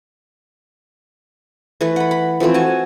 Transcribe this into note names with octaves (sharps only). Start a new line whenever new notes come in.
E3 A3 B4
F#5 B5
B5
E3 F3 A3 C4
F#4 G#5 A5